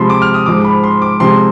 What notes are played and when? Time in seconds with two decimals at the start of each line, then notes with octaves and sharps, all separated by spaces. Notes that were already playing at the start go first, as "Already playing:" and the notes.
Already playing: C3 F3 G#3 B5 C6
0.10 D6
0.22 F6
0.34 D#6
0.46 G#2 F3 G#3 D6
0.64 B5
0.84 C6
1.02 D6
1.20 C3 F3 G#3 C6